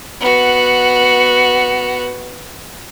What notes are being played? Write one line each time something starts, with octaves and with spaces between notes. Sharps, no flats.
B3 F#4